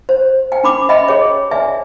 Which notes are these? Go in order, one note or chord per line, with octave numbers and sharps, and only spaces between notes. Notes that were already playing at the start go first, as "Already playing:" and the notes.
C5
G5 G#5
C#4 B5 D6
D#5 E5 G5 B5
G#4 C#5
D5 E5 G#5